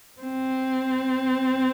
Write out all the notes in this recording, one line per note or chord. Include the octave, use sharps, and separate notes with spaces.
C4